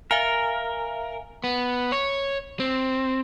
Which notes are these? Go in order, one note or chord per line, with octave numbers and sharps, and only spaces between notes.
A#4 E5 F5 G#5
B3
C#5
C4